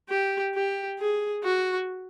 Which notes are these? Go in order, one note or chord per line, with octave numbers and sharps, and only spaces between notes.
G4
G4
G#4
F#4